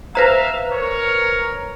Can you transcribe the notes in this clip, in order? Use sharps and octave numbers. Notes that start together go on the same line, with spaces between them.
B4 C5 E5 F5 A#5
A#4 C#5